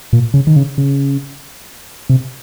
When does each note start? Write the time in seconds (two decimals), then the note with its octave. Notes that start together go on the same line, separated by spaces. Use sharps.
0.13 A#2
0.34 C#3
0.47 D#3
0.56 C#3
0.78 C#3
2.09 C3